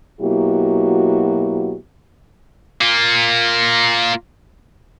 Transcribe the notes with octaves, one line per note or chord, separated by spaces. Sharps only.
B2 F#3 A#3 E4 F#4 G4
A#3 F4